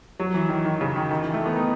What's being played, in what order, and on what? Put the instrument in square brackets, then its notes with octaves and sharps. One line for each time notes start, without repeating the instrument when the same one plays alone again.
[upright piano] F#3
E3
D#3
D#3
C#3
D#3
D#3
E3
A3
B3
D#4